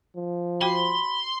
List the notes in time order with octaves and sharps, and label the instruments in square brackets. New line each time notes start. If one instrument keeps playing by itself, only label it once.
[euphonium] F3
[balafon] F#4 C5 G5 [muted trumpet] B5 [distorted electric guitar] C6